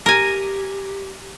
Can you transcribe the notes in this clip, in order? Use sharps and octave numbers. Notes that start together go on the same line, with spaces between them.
G4 A#4 G#5